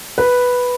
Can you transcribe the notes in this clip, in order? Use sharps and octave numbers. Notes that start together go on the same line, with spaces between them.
B4